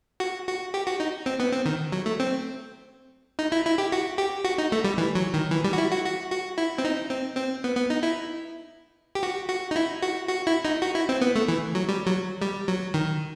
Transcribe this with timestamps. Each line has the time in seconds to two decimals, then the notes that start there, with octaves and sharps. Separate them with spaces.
0.20 F#4
0.47 F#4
0.74 G4
0.87 F#4
1.00 D#4
1.26 C4
1.40 B3
1.52 C4
1.66 D#3
1.92 F#3
2.06 A3
2.20 C4
3.39 D#4
3.52 E4
3.66 E4
3.78 G4
3.92 F#4
4.18 G4
4.44 F#4
4.58 D#4
4.72 A3
4.84 G3
4.98 E3
5.15 F#3
5.34 D#3
5.51 E3
5.64 G3
5.73 F#4
5.78 E4
5.92 F#4
6.05 F#4
6.31 F#4
6.58 E4
6.78 C4
6.85 D#4
7.10 C4
7.37 C4
7.64 B3
7.76 B3
7.90 D#4
8.03 E4
9.15 G4
9.23 F#4
9.49 F#4
9.71 D#4
9.76 E4
10.02 F#4
10.29 F#4
10.47 E4
10.65 D#4
10.82 F#4
10.95 E4
11.09 C4
11.21 B3
11.36 A3
11.48 E3
11.75 F#3
11.89 G3
12.06 F#3
12.42 G3
12.68 F#3
12.94 D#3